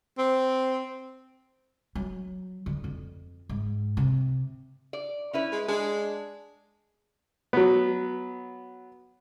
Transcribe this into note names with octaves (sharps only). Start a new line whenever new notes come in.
C4
F#3
D3
F2
G#2
C3
D5
C#4 E4 B4
G#3
G#3 D4
F#3 B3